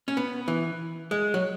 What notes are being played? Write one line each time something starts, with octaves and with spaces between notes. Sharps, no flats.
C#4
B3
E3
G#3
F#3